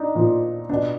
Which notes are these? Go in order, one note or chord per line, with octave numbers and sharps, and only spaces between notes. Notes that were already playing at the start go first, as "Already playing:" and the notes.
Already playing: D4 D#4
A#2 F3
B2 D4